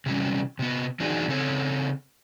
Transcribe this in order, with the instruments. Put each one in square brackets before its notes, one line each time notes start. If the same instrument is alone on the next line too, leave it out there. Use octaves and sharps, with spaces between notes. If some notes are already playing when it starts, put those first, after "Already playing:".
[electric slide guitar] C3 E3 F#3 G3 C#4
C3 B3
E3 F#3 D4 D#4 F#4 G#4
C#3 C4 A4 C#5